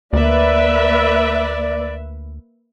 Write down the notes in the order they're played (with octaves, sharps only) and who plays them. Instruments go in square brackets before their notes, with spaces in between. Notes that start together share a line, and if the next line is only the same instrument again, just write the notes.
[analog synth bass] D2 [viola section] A#3 B4 E5 [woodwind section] D5